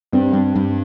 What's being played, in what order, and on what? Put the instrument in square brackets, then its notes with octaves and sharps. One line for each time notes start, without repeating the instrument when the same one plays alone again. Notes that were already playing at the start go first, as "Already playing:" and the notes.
[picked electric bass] G2 [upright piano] C4
[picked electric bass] G2
G2